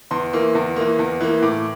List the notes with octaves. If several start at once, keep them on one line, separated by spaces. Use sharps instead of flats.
E2 C6
E3 A#3
E2
E3 A#3
E2
E3 A#3
A2 D6